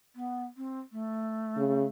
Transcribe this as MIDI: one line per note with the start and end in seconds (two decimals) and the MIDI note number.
0.15 0.44 59
0.57 0.79 60
0.92 1.87 57
1.57 1.85 49